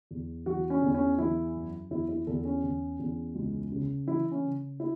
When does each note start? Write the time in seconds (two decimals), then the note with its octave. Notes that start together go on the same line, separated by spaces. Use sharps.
0.11 E2
0.46 E3 F#4
0.70 C#4
0.82 E2
0.94 C#4
1.18 E3 E4
1.55 F#2
1.90 E2 E4
2.09 E4
2.27 E2 A4
2.45 C#4
2.63 E2
2.99 E2
3.35 C#2
3.72 C#3
4.08 E3 E4
4.31 C#4
4.44 C#3
4.80 E4